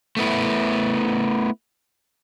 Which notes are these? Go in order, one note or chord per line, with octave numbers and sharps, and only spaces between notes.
A3 B3 E4